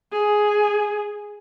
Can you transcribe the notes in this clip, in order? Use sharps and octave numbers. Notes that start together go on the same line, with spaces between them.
G#4